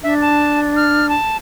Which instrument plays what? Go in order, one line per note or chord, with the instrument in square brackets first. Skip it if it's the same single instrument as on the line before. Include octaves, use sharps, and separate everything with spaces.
[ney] D4 [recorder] E5
[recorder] A5
F6
A5